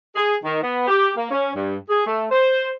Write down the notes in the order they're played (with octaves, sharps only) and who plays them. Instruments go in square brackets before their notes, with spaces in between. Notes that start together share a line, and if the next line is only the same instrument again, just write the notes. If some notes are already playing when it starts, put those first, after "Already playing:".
[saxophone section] G#4
D#3
B3
G4
A#3
C#4
G2
G#4
A3
C5